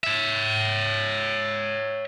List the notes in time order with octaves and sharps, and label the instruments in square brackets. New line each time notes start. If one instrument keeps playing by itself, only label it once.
[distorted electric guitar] C#5 E5